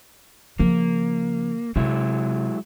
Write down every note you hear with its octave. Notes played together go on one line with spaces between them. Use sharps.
C#3 F3 A#3
C3 F#3 G#3 E4